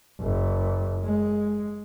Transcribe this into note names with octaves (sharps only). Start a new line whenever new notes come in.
F#1
G#3